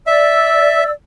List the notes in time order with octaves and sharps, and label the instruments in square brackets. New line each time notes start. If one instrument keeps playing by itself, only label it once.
[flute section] D5 E6 [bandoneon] E5